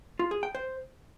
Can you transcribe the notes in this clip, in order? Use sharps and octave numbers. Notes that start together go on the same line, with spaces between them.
F4
G#4
G5
C5